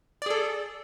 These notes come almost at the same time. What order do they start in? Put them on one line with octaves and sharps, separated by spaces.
D5 G#4 A4